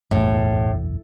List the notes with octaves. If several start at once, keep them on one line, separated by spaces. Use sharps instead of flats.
F#1 B1 E2 A2